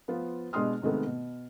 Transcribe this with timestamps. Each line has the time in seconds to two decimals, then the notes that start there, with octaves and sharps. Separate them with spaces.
0.08 F3 B3 F4
0.53 B2 G#3 D4 C6 D#6 F6
0.82 C3 D#3 G#3 A3 B3
1.06 B2